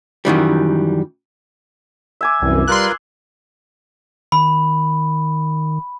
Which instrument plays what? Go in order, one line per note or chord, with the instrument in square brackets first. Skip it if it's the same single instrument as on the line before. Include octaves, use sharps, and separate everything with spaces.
[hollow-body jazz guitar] F#2 D#3 E3 G3
[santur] E5 G#5 D6
[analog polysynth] C2 [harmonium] F#2 E3
[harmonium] G3 [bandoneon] F4 A#4 B4 [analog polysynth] C6 F#6
[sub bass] D#3 [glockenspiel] B5